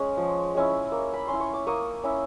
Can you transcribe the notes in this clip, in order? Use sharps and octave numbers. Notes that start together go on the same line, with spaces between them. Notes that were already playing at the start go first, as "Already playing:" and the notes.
Already playing: G#3 C#4
F3
G#3 C#4 E4
A#3
B5
C#4 C6
E4
C#6
D6
A#3 C#6 D#6
C#4 E4